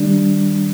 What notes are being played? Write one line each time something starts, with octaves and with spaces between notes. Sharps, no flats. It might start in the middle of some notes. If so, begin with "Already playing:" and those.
Already playing: D#3 G3 D4